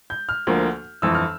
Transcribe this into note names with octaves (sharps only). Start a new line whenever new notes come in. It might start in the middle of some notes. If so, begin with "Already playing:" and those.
G6
F6
D2 D3 F3 A#3
G1 F2 E3 E6
F6